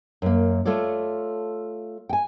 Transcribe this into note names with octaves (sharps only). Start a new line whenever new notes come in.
F#2 A#3
A3 F4 A4 C#5 D5
G5 G#5